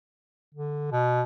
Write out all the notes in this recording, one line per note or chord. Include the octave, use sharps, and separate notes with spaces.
D3
B2